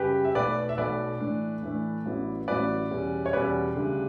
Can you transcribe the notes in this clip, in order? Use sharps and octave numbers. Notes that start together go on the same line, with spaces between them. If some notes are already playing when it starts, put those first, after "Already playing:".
Already playing: F#2 C#3 G3 G4 B4
E5
B1 B2 A3 B4 D5
E5
B1 B2 A3 B4 D5
A2 E3 A3 D4
A2 E3 A3 D4
A1 A2 F#3 B3 E4
A1 A2 F#3 B3 E4 B4 D5
E2 B2 G3 C#4
C#5
E2 B2 G3 C#4 B4 D5
D2 C#3 G3 D4